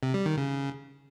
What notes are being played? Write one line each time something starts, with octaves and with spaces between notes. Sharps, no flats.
C3
G3
D#3
C#3